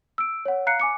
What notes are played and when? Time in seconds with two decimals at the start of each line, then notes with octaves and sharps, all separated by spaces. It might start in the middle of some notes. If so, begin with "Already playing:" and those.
0.18 E6 D7
0.45 C#5 F#5
0.66 F5 A#5 F#6 C7 C#7
0.80 G#5 D6 C#7